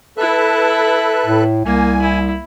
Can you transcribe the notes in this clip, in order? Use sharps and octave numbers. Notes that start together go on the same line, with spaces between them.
E4 A4 B4 E5 F#6
A2
C2 A#3 G#5
E4